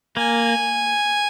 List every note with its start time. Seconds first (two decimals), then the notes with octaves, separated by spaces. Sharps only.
0.17 A#3 G#5